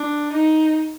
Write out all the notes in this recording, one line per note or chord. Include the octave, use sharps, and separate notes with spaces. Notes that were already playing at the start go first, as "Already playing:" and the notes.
Already playing: D4
D#4